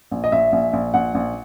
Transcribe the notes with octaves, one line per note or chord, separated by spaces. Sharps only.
A#1
D#5
A#1 E5
A#1
A#1
A#1 F#5
A#1